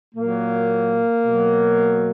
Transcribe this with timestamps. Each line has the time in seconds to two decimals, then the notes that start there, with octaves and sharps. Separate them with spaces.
0.15 A#2 F#3 A#3
1.25 B2 F#3